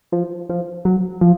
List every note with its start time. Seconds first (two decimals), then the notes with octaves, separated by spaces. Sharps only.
0.12 F3
0.50 F3
0.85 F#3
1.21 F3